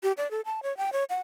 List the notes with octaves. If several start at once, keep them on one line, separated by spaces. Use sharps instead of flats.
G4
D5
A4
A5
C#5
G5
C#5
F#5